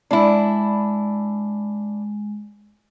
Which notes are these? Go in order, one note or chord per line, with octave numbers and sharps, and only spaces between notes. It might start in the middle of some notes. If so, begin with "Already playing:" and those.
G#3 D4 E4